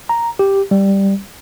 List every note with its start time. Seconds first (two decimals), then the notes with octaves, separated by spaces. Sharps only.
0.09 A#5
0.39 G4
0.71 G3